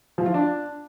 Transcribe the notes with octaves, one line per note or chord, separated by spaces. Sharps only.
F3
F4
D4